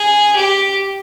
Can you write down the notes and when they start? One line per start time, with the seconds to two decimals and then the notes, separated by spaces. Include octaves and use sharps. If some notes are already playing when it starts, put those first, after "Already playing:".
Already playing: G#4
0.35 G4